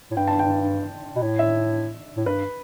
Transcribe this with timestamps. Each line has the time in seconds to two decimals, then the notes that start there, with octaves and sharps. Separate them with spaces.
0.11 A2
0.16 G2 G5
0.28 A5
0.39 G5
1.16 B2
1.22 A2
1.39 E5
2.17 A2
2.26 G2 B4